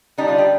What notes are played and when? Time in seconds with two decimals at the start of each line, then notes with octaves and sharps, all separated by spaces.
0.18 D3 G3 D4 D#4
0.28 F4
0.38 G4